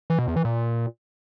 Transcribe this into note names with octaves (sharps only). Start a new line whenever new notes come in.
E3
B2
E2
E3
A#2